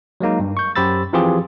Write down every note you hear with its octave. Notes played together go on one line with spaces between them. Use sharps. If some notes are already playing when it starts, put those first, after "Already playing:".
F#3 G#3 A#3 D#4
G2
C#6 G6
F#2 G4 C5 B5 E6 A6
E3 F3 C4 F4 G4 G#4